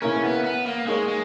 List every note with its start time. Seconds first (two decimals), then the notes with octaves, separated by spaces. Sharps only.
0.02 C#3 E3 A#3 C#4 E4 A#4
0.23 B3
0.44 B3
0.65 A#3
0.87 G#3 A#3 D#4 G#4 C#5
1.08 G#3